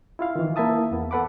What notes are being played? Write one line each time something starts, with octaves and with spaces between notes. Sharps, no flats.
E4 F4 F5
D#3 E3
A#3 E4 E5 A5 D#6
E2 B3
A4 B4 F#5 B5 D6